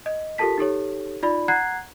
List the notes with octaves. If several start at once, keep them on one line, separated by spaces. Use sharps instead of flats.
D#5
F4 G4 A4 A#4 A5 B6
D#4 G4 A4 C#5
D#4 F4 D5 B5
F#5 A#5 F#6 G#6 C7